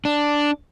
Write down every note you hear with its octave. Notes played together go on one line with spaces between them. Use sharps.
D4